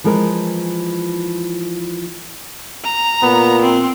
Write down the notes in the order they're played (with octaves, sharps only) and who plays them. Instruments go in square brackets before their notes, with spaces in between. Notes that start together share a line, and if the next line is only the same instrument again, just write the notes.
[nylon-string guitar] E3 F3 G#3 A#4
[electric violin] A#5
[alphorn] A#2 [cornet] B3
[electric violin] C4